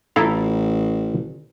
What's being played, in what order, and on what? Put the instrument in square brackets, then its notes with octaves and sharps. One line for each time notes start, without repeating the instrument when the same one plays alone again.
[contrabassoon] A1 [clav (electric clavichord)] E4 A4 F5 [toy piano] F4 A#5